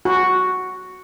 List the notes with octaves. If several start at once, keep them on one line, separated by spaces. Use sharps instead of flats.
F#4